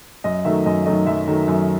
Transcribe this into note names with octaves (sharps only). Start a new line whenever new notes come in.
F#2 D#5
D#3 F#3 A3 E5
F#2 D#5
D#3 F#3 A3 D#5
F#2 E5
D#3 F#3 A3
F#2